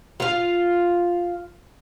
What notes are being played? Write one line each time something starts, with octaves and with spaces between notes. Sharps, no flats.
F4 F5